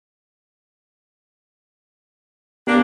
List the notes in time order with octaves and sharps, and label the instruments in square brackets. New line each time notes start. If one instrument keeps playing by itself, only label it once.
[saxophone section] A#3 D4 [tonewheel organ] B3 G4